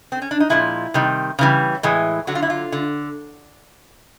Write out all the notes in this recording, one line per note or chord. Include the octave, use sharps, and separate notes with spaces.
C4
C#4
D4
D#4
A#2 F3 G#3 E4
C3 D#3 G3
C#3 E3 G3
A2 E3 G#3
D3 F#3 F#4
F4
E4
F4
D3